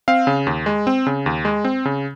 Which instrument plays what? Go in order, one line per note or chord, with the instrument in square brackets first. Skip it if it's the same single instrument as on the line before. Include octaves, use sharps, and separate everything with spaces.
[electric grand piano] C4 F5
C#3
D#2
G#3
C4
C#3
D#2
G#3
C4
C#3